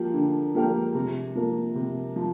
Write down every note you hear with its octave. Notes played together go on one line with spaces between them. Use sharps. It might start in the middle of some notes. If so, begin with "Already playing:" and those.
Already playing: F3 A#3 G4
D3
F3 A#3 G4 A#4
C3
F3 A#3
C3
F3